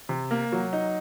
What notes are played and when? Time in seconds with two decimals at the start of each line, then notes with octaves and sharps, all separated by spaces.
0.09 C3
0.31 A#3
0.52 F#3
0.73 D#4